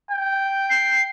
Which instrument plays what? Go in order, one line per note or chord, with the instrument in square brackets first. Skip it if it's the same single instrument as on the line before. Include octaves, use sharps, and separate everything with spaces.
[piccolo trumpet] G5
[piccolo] C7